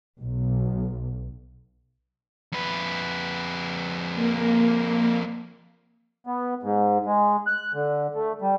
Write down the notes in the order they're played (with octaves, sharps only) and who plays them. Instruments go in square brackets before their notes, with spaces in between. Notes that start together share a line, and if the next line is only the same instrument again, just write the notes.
[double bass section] B1
[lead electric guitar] F2 B4
[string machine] A#3
[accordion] B3
G#2
G#3
F#6
D3
A3
G3